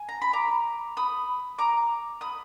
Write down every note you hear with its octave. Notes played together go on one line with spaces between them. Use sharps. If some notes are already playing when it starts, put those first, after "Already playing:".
Already playing: G#5
A#5
B5
A#5 D6
B5 D#6
A#5 D6
B5 D#6